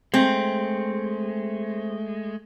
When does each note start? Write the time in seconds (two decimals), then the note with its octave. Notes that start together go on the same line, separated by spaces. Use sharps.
0.14 G#3 A3 C4